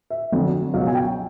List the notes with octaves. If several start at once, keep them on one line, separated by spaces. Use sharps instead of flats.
E5
F2 D3 F#3
C#2 B2 F#3 F5
G#5
G5